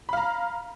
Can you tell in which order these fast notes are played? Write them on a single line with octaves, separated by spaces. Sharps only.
B5 F5 A#5